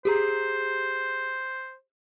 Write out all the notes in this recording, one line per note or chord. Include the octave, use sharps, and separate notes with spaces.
G4 G#4 C5 A#5